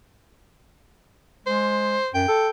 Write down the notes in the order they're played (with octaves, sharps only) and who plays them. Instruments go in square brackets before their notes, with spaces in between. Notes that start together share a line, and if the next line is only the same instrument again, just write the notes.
[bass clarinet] G#3 [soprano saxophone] C5
[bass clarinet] F#2 [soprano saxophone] G5
[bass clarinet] A4